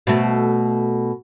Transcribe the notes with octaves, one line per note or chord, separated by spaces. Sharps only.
B2 A3